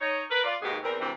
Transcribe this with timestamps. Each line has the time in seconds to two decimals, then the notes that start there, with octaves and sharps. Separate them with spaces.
0.01 D#4 C#5
0.30 A#4 B4
0.44 F4 D5
0.61 D#2 G#2 B2 B3 G4 G#4
0.83 E2 C4 A#4
0.99 D2 C3 E3 C4